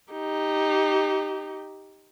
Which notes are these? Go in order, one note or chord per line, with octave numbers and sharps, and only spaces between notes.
D#4 G4